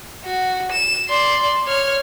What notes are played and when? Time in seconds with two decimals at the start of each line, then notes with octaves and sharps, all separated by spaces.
0.25 F#4
0.72 E7
1.09 D5 C6
1.67 C#5 F6